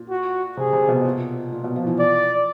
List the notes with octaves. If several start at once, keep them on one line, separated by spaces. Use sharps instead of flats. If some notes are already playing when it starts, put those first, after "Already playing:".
Already playing: A#2
F#4
C3 G#4
C3
B2
A#2
A#2
B2
F3
E3
D5